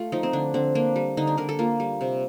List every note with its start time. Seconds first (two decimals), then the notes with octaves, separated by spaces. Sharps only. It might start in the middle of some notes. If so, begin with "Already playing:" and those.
Already playing: A3 F4
0.12 F3 D#4
0.23 C4
0.33 D3 D4
0.54 D3 C4
0.75 A#3 D4
0.96 G3
1.17 D3 D#4
1.27 D4
1.37 D3 A#4
1.49 A4
1.59 A#3 F4
1.80 G3
2.01 C3